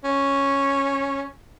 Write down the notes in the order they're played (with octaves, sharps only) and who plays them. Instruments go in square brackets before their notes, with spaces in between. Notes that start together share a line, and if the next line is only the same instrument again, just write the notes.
[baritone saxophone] C#4